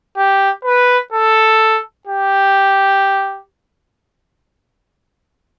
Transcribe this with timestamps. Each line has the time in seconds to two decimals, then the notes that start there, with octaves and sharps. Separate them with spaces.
0.17 G4
0.65 B4
1.13 A4
2.07 G4